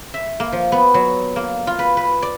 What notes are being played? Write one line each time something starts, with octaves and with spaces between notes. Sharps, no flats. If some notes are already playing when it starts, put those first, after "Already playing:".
E5
A#3
F3
B3
F#3
A#3
F4
B4
B4
D5